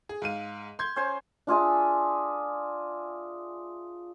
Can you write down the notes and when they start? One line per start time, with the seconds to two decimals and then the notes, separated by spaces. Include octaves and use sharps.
0.09 G#4
0.22 G#2 F5 D#7
0.79 C6 G6 G#6
0.96 C#4 C5 G#5
1.47 D4 F4 G#4 E5